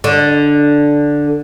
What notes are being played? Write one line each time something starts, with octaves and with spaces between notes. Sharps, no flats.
D3